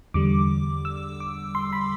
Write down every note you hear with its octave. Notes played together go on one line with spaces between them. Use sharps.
E2 D3 G3 D6
E6
D6
C6
B5